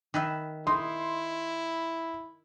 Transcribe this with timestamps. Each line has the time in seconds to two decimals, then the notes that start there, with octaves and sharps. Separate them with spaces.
0.14 D#3 B4 E5
0.67 D#4 E4 C6